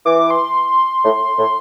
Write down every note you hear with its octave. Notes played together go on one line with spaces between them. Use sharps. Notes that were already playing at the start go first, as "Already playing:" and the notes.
E3 D6
C6
A2
A2